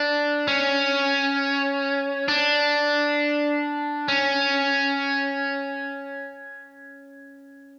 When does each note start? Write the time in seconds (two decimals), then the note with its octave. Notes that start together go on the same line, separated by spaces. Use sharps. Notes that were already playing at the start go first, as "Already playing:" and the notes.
Already playing: D4
0.48 C#4
2.28 D4
4.08 C#4